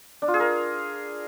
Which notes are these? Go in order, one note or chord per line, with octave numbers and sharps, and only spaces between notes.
D4
F4
G#4
A#4